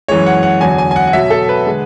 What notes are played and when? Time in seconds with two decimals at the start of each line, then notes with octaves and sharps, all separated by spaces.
0.08 F#2 E3 G#3 C#5
0.27 F#5
0.43 F#5
0.61 E2 D3 F#3 G#5
0.78 G#5
0.91 G#5
0.96 F#5
1.07 F#5
1.13 B2 F#3 E5
1.30 A4
1.49 B4
1.66 D3 G#3